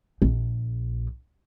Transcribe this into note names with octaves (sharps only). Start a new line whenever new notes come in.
A#1